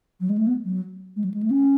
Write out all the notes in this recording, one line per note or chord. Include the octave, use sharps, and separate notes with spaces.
F#3
G#3
A3
B3
F#3
G#3
F#3
G#3
A3
C#4